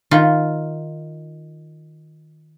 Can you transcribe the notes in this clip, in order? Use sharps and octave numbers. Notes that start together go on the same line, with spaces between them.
D#3 F4